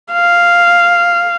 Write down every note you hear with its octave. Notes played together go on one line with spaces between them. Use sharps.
F5